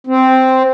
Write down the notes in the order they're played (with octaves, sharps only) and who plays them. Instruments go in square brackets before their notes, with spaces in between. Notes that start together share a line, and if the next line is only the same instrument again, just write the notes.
[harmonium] C4